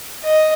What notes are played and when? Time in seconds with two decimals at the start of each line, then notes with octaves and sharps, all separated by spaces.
0.24 D#5